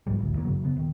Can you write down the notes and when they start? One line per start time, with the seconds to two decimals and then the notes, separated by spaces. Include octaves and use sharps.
0.07 B1 G#2 F3 G3
0.20 A1 D2
0.33 E2 D#3 A#3
0.45 F#2 C#3 F#3
0.63 C#3 B3
0.76 D#1 D#3